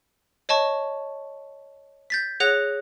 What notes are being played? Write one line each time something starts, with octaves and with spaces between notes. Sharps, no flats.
C#5 D#5 A5 C#6
G6 A6 B6
G#4 C#5 F#5 F#6 A#6 F7